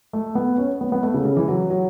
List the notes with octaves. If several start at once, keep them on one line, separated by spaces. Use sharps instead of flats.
A3
B3
C#4
B3
B3
A3
C#3
C#3
E3
F#3
F#3